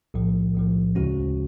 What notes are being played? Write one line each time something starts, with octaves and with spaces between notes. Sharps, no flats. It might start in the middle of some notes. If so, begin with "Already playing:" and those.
B1 A2 F3
B1 A2 F3
D2 C#3 G#3 C#4 F#4